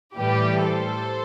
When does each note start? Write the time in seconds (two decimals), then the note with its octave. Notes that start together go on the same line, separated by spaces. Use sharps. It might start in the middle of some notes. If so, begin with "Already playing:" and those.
0.17 A2 E3 G3 G4 B4
0.64 A4 C5